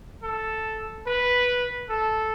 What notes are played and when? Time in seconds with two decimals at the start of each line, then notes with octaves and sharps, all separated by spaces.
0.23 A4
1.07 B4
1.90 A4